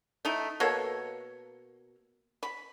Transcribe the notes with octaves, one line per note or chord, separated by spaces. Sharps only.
A3 D#4 E4
B2 A#3 A4 C#5
B5